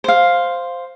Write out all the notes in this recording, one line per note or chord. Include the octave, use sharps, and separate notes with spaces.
C5 F5